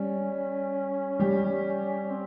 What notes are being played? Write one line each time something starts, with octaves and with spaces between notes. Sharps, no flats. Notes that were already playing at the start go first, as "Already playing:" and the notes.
Already playing: G3 C#4
G3 G4
C4